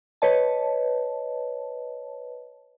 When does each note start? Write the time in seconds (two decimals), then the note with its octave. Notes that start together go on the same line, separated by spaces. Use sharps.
0.22 B4 C#5 D#5 A5